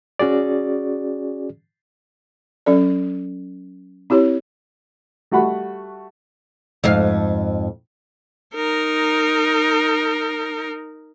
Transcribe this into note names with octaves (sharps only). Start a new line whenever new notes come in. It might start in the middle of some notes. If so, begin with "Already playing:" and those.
C#4 F#4 G#4 D5
F#3 C#4 A4 D5
C4 E4 G4 C#5
G3 A3 F#4 F#5 B5
F2 G#2 F5
D#4 A#4